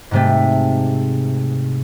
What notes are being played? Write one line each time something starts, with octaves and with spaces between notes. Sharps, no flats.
G#2 C3 A3